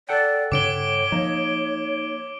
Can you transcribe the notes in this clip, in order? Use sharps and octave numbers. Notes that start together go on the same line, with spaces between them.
A4 D5 F#5 G5
G2 C#3 D4 C#5 D6 D7 G7
F3 A#3 D#4